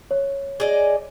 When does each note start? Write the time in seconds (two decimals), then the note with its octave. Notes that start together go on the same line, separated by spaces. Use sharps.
0.11 C#5
0.60 G#4 D5 D#5